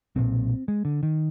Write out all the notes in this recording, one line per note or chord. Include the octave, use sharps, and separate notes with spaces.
B1 A#2 C4
G#3
D3
D#3